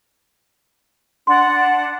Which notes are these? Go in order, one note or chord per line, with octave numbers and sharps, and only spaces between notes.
D4 F#5 C6